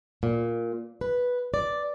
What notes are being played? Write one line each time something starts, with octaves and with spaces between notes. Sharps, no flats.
A#2
B4
D5